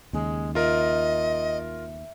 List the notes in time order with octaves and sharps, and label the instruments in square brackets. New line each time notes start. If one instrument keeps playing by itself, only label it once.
[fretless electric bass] D#2 C#3 [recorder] G#3
[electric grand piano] F4 A#4 [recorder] D#5 [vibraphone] E5